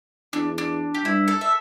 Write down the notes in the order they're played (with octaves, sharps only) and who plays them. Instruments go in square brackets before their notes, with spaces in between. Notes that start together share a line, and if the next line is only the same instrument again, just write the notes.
[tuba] E2 [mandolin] D4
[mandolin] D4
G4
[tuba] G2 [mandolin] E4
[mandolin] A4
E5